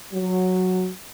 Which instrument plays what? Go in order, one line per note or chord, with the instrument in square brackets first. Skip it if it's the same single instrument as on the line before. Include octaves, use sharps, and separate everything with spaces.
[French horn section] F#3